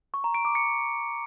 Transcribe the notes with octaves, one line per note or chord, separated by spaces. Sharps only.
C#6
A#5
D7
D6
C#7